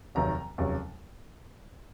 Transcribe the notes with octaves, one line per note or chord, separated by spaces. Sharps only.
F1 D#2 D#3 F#3 A#5
F1 D#2 C#3 F#3